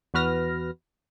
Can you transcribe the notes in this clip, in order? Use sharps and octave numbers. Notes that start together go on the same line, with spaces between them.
E2 F#4 B4 F6 A#6